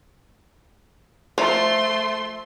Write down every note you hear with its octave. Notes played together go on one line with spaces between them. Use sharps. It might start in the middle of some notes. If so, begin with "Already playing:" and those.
F3 A3 C6